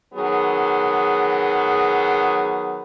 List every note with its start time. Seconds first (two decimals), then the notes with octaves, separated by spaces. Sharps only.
0.14 D#3 F#3 B3 G#4